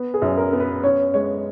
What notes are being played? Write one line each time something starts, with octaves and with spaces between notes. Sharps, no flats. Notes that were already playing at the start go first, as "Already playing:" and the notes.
Already playing: B3
G#4
F#2
A#4
B3
B4
C#4 C#5
G#3 C#5